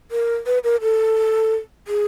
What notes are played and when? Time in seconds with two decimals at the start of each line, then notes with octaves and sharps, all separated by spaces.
0.11 A#4
0.46 B4
0.64 A#4
0.81 A4
1.87 G#4